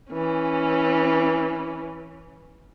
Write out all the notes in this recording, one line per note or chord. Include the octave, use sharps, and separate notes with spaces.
E3 C#4